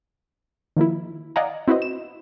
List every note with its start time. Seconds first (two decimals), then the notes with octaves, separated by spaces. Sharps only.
0.77 D#3 F3 A#3 E4
1.36 D5 D#5 F5 F#5 G#5 A#5
1.68 C4 E4 F#4 B4 C5 D#5
1.82 E7